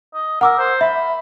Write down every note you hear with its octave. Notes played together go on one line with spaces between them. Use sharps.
D#5
A#4 F#5 D6 E6
C5
E5 B5